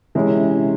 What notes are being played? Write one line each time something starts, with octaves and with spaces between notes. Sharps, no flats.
C3 E3 G#3 C#4 E4